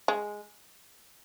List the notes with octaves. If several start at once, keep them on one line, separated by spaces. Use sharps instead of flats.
G#3